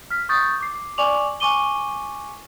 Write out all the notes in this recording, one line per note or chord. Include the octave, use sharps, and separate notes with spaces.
F6 B6
C#6 D#6 G6 A6
D6 C7
D5 G#5 C#6 D6 F7 F#7
G#5 C#6 D6 D#7 G7